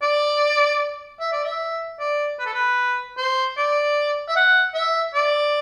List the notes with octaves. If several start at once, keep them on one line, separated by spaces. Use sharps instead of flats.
D5
E5
D5
E5
D5
B4
A4
B4
C5
D5
E5
F#5
E5
D5